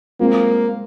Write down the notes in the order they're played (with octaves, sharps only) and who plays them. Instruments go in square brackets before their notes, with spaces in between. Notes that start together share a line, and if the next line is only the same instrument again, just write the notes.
[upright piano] G#3 C4 F4 [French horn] A#3